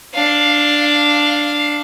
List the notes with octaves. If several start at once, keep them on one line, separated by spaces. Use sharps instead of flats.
D4 F5